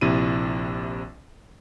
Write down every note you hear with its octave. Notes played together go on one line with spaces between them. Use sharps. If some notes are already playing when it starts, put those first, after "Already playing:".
A#1 C3 E4 D#7